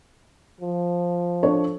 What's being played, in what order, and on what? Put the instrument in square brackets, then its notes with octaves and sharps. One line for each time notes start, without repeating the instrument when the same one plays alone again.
[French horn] F3
[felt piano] D4 A4 C#5